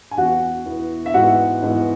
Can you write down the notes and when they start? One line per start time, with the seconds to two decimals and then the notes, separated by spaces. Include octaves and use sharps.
0.11 G#5
0.17 E2 E3 B3 E4 F#4 F#5
0.66 E2 E3 B3 E4
1.06 E5
1.14 G#2 E3 B3 E4 F#4 F#5
1.62 G#2 E3 B3 E4